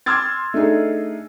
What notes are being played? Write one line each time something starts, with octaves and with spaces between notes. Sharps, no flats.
C6 D6 E6 F6 G#6 A6
A3 D4 D#4 G#4